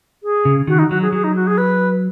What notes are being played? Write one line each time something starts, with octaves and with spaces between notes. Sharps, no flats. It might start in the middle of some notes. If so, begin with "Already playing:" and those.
G#4
C#3
D#3 F#4
D#4
F#3 F#4
G#4
F#3 G#4
D#4
F#4
G#4
B4